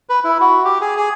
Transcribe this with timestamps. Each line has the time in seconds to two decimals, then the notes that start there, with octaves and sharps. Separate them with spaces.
0.09 B4
0.24 E4
0.40 F#4
0.65 G4
0.81 G#4
0.97 G#4